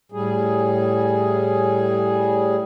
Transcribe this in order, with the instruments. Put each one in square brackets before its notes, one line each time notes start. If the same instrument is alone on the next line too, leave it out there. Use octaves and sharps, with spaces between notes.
[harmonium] A2 G3 G#4